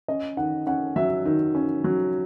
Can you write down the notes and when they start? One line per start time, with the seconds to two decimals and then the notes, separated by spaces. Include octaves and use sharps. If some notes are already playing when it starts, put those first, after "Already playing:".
0.08 C#4 D#5
0.37 D#3 F#5
0.67 C#4 F#5
0.96 F#3 E5
1.26 D#3
1.55 C#4
1.84 F#3